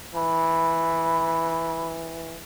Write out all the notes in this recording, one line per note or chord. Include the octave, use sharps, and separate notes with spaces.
E3 B5